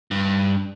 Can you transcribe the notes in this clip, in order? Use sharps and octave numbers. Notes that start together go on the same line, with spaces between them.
G2